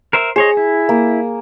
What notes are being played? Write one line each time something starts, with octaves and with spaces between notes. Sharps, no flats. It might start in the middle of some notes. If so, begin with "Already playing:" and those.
A#4 C5 E5
G#4 C5 C#5 D#5
E4
A#3